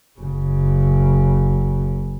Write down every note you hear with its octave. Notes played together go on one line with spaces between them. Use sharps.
F#1 C#3